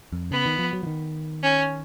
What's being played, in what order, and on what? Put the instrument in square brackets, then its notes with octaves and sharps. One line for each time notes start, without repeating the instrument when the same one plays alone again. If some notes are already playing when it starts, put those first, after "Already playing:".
[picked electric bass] F2
[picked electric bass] C#3 [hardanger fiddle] B3
[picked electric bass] D#3
F3
F#3
F3
D#3
[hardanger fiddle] C#4